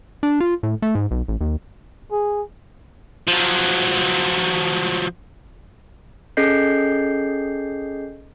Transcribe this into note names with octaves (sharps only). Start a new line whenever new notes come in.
D4
F4
A2
A3
G#2
B1
A1
D#2
G#4
F3 F#3
C#4 G#4 A4 D#5 G6 C7